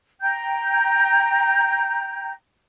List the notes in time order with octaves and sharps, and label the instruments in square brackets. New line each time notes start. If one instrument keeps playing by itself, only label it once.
[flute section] G5 A#5 G6